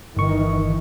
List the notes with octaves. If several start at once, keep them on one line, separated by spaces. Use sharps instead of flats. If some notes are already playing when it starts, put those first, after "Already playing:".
G1 D#3 E3 C#6